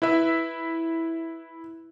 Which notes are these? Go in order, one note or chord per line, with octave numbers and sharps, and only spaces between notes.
E4 B4 E5